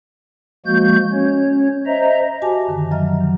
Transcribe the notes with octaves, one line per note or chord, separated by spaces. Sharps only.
F3 G#3 A#3 F#4 G6
C#4 C#5
C5 D#5 E5 A#5
F#4 G4 G#5 A5 D6 A#6
F#2 D3 D#3
F3 F#3 D#5 E5 A#5 F6
D#3